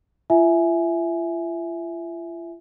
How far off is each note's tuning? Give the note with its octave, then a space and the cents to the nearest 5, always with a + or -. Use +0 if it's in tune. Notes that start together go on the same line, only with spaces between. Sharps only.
F4 -45 E5 +0 G#5 +10